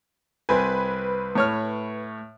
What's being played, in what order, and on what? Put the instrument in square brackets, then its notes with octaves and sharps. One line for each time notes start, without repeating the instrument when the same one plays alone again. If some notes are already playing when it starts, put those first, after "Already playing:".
[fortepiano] C2 C4 G#5 [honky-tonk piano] B4
[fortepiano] A2 C#5 F6